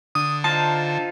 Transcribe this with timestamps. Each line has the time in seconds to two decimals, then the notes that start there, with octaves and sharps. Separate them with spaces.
0.15 D3 D#6
0.44 D#4 F4 C5 A5